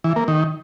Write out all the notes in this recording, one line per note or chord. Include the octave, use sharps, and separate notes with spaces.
E3
A#3
D#3